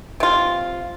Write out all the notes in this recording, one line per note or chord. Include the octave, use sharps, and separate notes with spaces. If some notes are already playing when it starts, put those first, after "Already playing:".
C3 F4